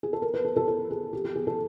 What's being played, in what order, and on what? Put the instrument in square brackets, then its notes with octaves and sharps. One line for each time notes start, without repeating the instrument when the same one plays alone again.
[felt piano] G#4
A4
A#4
B4
A4
A4
A4
G#4
G4
G4
G#4
A4